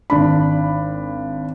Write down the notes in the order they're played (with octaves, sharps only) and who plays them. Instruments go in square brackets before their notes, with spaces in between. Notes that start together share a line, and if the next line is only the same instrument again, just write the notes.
[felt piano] G#1 D4 B5